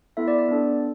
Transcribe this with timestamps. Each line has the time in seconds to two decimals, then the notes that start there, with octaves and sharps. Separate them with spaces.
0.17 B3 E4 A4 E5
0.28 D5
0.38 D5
0.48 B3 D4 A4